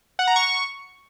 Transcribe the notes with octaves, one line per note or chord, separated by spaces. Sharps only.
F#5
A#5
C#6